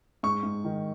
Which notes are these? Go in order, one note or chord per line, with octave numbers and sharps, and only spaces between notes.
G#2 C#6
G#2
D#3